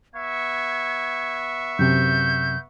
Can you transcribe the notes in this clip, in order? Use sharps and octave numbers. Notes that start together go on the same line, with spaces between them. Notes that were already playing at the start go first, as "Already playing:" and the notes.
B3 E5 C#6 G#6
F#2 C3 G6